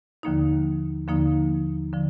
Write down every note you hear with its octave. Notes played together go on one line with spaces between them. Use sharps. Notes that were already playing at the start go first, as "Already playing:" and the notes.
D#2 D3 F3 A#3 D#4
D#2 D3 F3 A#3 D#4
D3 F3